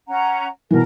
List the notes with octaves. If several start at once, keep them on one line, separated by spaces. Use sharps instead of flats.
C#4 F#5 A#5
B2 E3 A#4